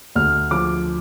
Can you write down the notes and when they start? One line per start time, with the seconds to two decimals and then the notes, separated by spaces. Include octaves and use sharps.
0.16 D2 F6
0.51 F3 D6